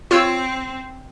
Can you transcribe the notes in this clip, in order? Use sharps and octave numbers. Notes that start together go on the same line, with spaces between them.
C4 F4 C#5 E6